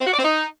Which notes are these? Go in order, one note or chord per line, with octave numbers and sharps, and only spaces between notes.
C4
F#4
D5
C4
D#4